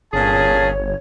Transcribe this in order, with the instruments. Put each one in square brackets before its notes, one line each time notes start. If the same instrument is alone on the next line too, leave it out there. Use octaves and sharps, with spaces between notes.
[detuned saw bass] G1 [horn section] A#2 C#4 G#4 [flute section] C#5 [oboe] A5